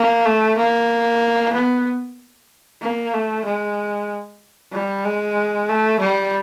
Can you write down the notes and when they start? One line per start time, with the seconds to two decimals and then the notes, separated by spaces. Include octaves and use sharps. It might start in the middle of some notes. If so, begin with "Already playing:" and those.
Already playing: A#3
0.26 A3
0.58 A#3
1.54 B3
2.82 A#3
3.14 A3
3.45 G#3
4.72 G3
5.05 G#3
5.69 A3
6.00 G3